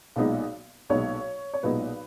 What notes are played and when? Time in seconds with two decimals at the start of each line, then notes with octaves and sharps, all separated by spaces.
0.16 B1 A#2 G#3 B3 D#4
0.90 B1 A#2 G#3 B3 D#4 C#5
1.54 C#5
1.63 B1 A#2 G#3 B3 D#4 B4